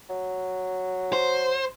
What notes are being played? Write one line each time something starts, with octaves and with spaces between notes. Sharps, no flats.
F#3
C5